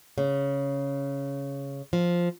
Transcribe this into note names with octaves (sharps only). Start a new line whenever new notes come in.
C#3
F3